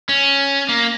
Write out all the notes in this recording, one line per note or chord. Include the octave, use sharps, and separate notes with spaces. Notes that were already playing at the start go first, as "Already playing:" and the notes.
C#4
A#3